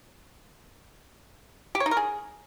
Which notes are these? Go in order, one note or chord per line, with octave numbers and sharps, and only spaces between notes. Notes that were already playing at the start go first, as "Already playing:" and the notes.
G4
C#5
D#4
A#4
G#4